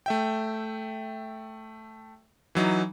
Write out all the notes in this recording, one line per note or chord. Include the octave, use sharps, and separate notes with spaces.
A3 E5 G5
E3 F#3 D#4